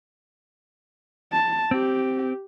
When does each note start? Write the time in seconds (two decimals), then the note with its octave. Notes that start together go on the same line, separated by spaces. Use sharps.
1.33 A5
1.71 C4 G4